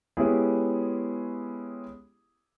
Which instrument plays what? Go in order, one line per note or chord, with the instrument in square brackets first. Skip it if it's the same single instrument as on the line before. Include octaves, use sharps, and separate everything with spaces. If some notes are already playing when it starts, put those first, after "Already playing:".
[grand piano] G#3 B3 C#4 E4 G4 G#4